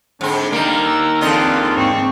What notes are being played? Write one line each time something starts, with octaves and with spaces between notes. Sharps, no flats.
G#2 D3 C4
G3 A#3 D#4 A#4
E6
E2 D3 C4 D4 F4 A4 D#5
G#2 C4 C#6